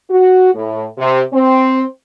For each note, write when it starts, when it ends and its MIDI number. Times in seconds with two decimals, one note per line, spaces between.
0.10 0.51 66
0.54 0.84 45
0.98 1.22 48
1.33 1.84 60